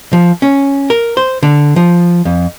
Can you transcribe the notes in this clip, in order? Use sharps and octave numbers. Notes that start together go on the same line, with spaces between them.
F3
C#4
A#4
C5
D3
F3
F2